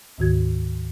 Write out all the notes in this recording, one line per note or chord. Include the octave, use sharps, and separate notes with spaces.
D2 G#2 D#3 F#4 G#6